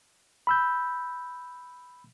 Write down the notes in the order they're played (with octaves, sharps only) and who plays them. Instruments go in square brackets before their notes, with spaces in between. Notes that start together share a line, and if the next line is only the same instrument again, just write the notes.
[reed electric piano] B5 E6 G6